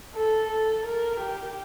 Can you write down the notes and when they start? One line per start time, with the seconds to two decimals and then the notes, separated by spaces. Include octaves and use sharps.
0.15 A4
0.50 A4
0.85 A#4
1.19 G4